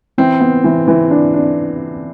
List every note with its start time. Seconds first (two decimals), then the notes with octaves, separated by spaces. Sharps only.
0.18 E3 C4
0.40 B3
0.64 E3
0.88 E3
1.11 D4
1.34 D4